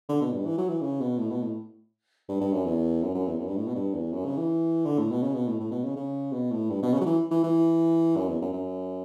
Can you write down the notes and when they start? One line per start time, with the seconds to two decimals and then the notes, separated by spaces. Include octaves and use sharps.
0.09 D3
0.21 B2
0.33 G2
0.46 E3
0.58 F#3
0.69 E3
0.81 C#3
1.01 B2
1.18 A2
1.31 B2
1.42 A2
2.29 G2
2.41 G2
2.53 F#2
2.66 E2
3.03 F#2
3.14 F#2
3.27 E2
3.39 F#2
3.48 G2
3.57 A2
3.67 B2
3.75 G2
3.93 E2
4.13 F#2
4.25 C#3
4.37 E3
4.85 D3
4.98 A2
5.11 B2
5.22 C#3
5.34 B2
5.48 A2
5.60 A2
5.71 B2
5.84 C#3
5.96 C#3
6.33 B2
6.51 A2
6.70 G2
6.82 B2
6.93 C#3
7.01 F#3
7.06 E3
7.31 E3
7.44 E3
8.17 F#2
8.28 E2
8.42 F#2
8.53 F#2